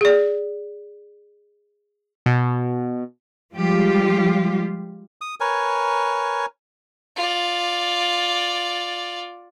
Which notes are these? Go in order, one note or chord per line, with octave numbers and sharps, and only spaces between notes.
G#4 D5
B2
F3 G3 G#3 F4 G4
D#6
A#4 B4 C#5 G#5
F4 D5